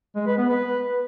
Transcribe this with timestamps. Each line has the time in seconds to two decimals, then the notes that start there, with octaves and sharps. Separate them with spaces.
0.16 G#3
0.27 B4
0.38 B3
0.49 B4